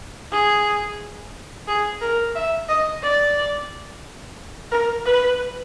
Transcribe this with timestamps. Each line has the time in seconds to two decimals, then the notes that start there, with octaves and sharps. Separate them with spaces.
0.32 G#4
1.67 G#4
2.01 A#4
2.35 E5
2.69 D#5
3.03 D5
4.71 A#4
5.05 B4